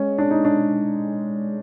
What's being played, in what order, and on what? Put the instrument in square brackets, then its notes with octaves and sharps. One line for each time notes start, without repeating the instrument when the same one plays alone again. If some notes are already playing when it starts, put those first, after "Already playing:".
Already playing: [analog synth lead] G#3 [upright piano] C#4
[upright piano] D4
D#4
D4